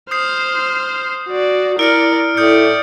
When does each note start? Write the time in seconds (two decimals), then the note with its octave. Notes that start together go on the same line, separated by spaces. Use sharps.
0.11 C5 D#6 F6 G6 C7
1.29 F#4 D5
1.79 E4 A#4 D5 F6 C#7 D7
2.37 A2 D5 D#6 G6 C#7